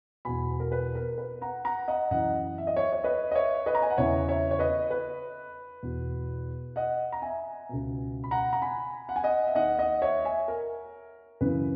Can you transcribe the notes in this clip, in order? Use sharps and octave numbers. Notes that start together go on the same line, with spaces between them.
E2 B2 G#5 B5
A#4
B4
A#4
B4
F#5 A#5
F#5 A#5
D#5 F#5
F#2 E3 D#5 F#5
E5
D#5
C#5 E5
C#5
B4 D#5
D#5
C#5 E5
B4 D#5
A#5
G#5
F#5
E2 C#3 E3 C#5 E5
C#5 E5
C#5
B4 D#5
B4
E2 B2
D#5 F#5
A#5
E5 G#5
C#2 B2
B5
F#5 A#5
A#5
G#5 B5
F#5
G#5
D#5 F#5
E5
D#2 D#3 D#5 F#5
D#5 F#5
C#5 E5
E5 G#5
A#4
F#2 C#3 E3 B4